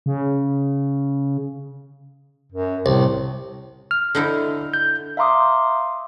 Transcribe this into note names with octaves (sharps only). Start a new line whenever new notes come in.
C#3
F#2
C2 A2
F6
D3 D#4 E4
G6
E5 F5 A#5 C6 D6 D#6